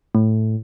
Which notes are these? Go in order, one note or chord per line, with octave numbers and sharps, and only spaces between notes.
A2